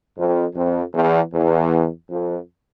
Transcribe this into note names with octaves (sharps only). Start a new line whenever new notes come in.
F2
F2
E2
E2
F2